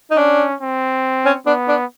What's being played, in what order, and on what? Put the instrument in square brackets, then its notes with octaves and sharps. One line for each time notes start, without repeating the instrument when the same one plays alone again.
[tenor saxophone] D#4
[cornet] C#4 [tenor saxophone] D4
[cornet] C4
[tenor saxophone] C#4
[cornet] B3 [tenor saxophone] D4
[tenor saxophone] D4